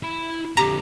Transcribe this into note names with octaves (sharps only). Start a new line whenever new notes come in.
E4 B5
F2 D3 G4 A#5